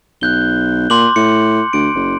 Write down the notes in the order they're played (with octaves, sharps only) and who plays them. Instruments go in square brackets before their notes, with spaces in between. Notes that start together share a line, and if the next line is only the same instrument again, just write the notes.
[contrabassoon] B1 [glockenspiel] F#6 G6 G7
[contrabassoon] A#2 [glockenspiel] C6 D6 F#7
[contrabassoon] A2 [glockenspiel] C#7
[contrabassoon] D2 [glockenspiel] D7
[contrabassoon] F#1